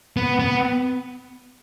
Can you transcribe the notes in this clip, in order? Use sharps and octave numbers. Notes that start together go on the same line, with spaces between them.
B3
B3